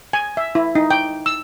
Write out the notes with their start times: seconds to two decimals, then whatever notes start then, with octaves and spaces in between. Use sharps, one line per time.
0.13 G#5
0.37 E5
0.55 E4
0.75 D#4
0.91 G5
1.26 E6